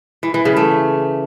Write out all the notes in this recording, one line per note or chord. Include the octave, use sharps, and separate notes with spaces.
E3
E3
C#3
A3